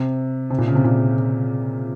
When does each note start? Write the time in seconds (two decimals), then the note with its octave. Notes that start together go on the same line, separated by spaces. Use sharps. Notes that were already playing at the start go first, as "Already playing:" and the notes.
Already playing: C3
0.50 C3
0.58 A#2
0.68 C#3
0.75 C3
0.84 A#2